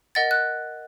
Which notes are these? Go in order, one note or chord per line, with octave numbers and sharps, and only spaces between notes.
A#4 D#5 F#5 A6
F#6